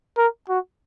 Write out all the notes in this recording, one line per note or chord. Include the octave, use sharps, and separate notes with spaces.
A#4
F#4